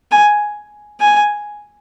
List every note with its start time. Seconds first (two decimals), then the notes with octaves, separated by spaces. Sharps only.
0.11 G#5
1.00 G#5